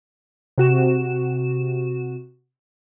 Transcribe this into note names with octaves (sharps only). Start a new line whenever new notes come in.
C3 F#4 E7